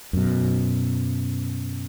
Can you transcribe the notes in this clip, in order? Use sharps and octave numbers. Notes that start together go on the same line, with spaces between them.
F#2 B2